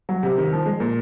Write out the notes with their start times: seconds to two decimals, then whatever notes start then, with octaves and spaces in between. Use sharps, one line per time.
0.09 F#3
0.23 C3
0.38 D#3
0.52 F3
0.66 G#3
0.80 A#2